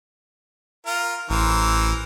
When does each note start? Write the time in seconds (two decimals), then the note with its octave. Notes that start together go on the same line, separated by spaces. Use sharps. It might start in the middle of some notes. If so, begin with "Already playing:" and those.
0.86 F4 A#4
1.30 A1 E3 A#4 C5